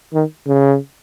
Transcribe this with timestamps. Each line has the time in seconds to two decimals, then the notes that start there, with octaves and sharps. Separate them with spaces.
0.13 D#3
0.47 C#3